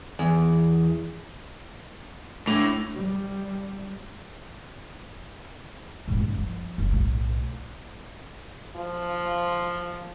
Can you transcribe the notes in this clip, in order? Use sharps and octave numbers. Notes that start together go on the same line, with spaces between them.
E2
A2 D4
G3
D#1 G#2
F#1
F3
F#1
B1 A2
F3